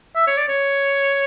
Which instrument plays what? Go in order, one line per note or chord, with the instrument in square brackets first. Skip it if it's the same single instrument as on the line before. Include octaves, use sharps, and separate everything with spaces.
[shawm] E5
C#5
D5
C#5